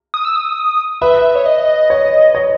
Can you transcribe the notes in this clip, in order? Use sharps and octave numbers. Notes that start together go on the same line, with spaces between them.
D#6
E6
D#6
B4 E5
C#5
D#5
C#5
C#5